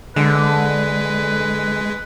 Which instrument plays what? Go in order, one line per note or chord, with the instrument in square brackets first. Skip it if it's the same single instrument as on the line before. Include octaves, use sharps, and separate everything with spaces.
[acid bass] D3 [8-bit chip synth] G#3 [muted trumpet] B4